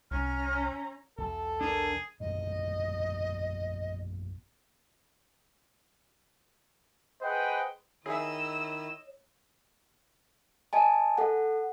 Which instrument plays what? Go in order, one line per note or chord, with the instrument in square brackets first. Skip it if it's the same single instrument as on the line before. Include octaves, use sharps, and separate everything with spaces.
[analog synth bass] C2 [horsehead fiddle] C#4 A#5 [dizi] F6
[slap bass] B1 E2 F#3 [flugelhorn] A4
[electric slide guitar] D4 A#4 [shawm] G#4
[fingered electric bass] A#1 F#2 A#2 [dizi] D#5
[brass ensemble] G#4 B4 C5 D#5 F#5 G5
[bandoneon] D#3 E4 [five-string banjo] G#4 E5 [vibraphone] C#5 [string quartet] D#5 E6
[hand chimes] D#5 G#5 A5
A4 F#5